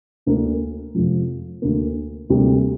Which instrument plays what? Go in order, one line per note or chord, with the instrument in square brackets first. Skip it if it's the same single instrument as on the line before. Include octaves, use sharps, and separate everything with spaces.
[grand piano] D2 D3 A#3 D4 A#4
F2 C3 F3
D2 D3 A#3
D2 C3 G3 A#3